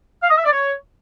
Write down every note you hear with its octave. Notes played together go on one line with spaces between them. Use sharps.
F5
D#5
E5
D5
C#5